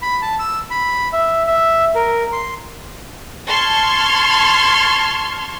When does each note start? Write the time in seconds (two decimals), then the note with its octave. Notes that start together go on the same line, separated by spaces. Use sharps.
0.02 B5
0.22 A5
0.39 E6
0.71 B5
1.13 E5
1.47 E5
1.95 A#4
2.33 C6
3.48 A5 C6 C#6 F6 G#6